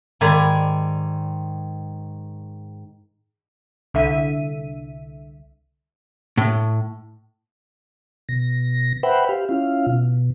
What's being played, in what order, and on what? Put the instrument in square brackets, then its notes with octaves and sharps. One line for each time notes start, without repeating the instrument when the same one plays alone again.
[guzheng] G#2 D#3 D5 G#5 B5
[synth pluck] C2 D3 E5 D#7
[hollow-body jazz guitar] A2
[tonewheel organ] B2 A#6
B4 C5 E5 F#5 G5 B5
G4 F5
C#4 E4 F4 F5
B2